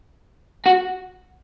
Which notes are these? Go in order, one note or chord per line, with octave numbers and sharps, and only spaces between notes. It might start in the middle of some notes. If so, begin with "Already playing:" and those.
F#4